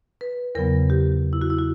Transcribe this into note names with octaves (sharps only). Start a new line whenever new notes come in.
B4
E2 C#3 F#3 B3 A#4
G4
E4
F#4
E4
F#4